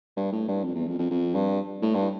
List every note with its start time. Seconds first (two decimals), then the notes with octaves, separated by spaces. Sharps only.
0.17 G2
0.32 A2
0.48 G2
0.64 F2
0.75 E2
0.88 F2
0.99 F2
1.11 F2
1.35 G2
1.82 A2
1.95 G2